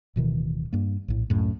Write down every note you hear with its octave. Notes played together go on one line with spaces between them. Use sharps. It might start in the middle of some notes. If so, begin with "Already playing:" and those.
D1 B2 D#3 E3
G2 A#3
A#1 A2
C#2 F#2 A2